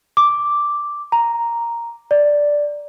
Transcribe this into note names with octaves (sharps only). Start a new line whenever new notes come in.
D6
A#5
D5